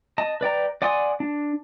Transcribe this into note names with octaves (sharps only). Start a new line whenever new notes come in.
D#5 A5
B4 D5 G5 A#5
D5 F#5 G#5 C6 D#6
D4